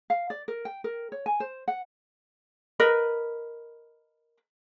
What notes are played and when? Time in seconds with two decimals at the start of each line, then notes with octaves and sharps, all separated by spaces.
0.10 F5
0.30 D5
0.48 A#4
0.65 G5
0.84 A#4
1.12 C#5
1.26 G#5
1.40 C5
1.68 F#5
2.80 A#4 B4 D#5